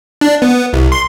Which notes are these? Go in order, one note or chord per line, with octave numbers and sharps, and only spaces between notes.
D4
B3
C2
C6